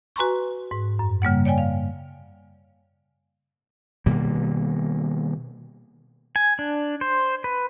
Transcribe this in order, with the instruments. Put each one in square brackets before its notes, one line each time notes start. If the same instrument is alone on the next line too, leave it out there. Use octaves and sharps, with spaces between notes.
[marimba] F#4 B4 G#5 A#5 C6 C#6
G#2
F#2
C#3 G3 A#3 F#5
C#5 D5 G5 G#5
F5
[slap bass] B2 D#3 G3 A#3
[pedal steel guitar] G#5
D4
C5
B4